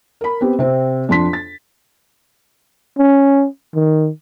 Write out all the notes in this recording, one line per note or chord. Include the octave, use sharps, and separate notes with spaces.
A#4 B5
B3 C4 G4
C3 C4
F2 D4 C6 B6
A6
C#4
D#3